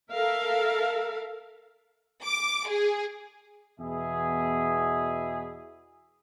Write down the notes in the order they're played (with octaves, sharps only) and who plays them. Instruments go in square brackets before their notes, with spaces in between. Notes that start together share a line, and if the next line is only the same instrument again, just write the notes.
[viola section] A4 A#4 E5 F5
[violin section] D6
G#4
[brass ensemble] E2 B2 G#4 E5